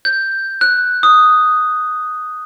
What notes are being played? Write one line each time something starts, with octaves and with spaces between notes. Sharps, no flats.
G6
F#6
D#6